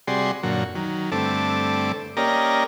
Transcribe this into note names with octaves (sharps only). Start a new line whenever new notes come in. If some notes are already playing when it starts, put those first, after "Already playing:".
C3 G3 F#4 G#4 D5 C6
F#2 A#2 D3 F#4
D#3 F#3
G2 D3 A3 C4 A5 D6
A#3 C#4 G4 D5 D#5 A#5